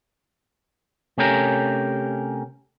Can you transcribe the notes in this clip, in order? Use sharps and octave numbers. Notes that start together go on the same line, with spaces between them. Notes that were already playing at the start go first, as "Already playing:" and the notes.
C3 A3 C#4 G4 A#4